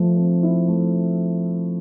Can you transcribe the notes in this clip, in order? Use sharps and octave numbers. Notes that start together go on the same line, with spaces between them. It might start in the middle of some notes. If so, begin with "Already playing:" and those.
Already playing: F3 A3
C4
E4
A3